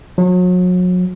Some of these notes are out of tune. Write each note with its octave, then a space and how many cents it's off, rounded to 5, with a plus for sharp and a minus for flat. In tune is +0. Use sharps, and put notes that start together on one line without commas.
F#3 -35